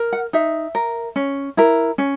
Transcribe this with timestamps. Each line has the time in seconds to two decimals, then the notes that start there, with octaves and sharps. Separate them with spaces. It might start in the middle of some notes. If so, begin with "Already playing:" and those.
Already playing: A#4
0.13 F#5
0.33 D#4 E5
0.75 A#4
1.16 C#4
1.57 E4 A#4
1.98 C#4